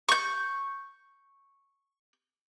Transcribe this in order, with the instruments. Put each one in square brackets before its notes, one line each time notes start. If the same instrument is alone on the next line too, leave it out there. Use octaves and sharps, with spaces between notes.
[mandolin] C#6 G6